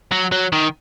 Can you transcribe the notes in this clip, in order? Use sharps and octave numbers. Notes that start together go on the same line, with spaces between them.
F#3
F#3
D#3